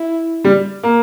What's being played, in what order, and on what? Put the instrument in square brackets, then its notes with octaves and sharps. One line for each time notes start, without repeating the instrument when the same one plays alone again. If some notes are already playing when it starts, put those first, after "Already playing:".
Already playing: [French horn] E4
[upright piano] G3
A#3